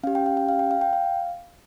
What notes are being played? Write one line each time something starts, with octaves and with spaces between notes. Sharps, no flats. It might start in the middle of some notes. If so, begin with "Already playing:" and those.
C#4 G4 F5
G5
F5
G5
F5
G5
F5
G5
F5